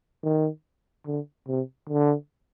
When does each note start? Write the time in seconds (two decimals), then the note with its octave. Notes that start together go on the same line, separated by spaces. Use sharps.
0.23 D#3
1.06 D3
1.48 C3
1.89 D3